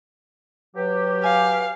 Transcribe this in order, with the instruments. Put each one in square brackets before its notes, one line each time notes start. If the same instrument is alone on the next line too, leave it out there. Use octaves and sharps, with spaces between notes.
[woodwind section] F#3 G4 [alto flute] B4
[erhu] F5 [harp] G#5